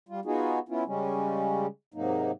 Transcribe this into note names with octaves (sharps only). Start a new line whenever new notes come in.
G3 F4
B3 D#4 F4 F#4 G#4
B3 C#4 E4 F4
C#3 G3 G#3 C#4
G#2 C3 F#3 A#3 D#4